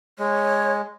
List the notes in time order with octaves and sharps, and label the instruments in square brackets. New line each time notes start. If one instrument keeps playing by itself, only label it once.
[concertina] G#3 [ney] C#5